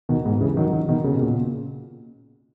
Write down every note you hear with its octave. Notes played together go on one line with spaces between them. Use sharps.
B2 D#3
G#2
C#3 E3
D#3 F#3
D#3 F#3
B2 D#3
C#3
B2
A#2 C#3